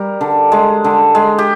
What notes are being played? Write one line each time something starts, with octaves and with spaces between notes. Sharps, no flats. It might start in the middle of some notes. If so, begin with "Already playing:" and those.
Already playing: G3 A#4
D3
G#3
D3
G#3
G4